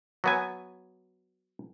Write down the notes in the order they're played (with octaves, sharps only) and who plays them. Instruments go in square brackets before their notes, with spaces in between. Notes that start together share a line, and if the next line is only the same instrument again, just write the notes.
[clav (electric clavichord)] F#3 B3 G#5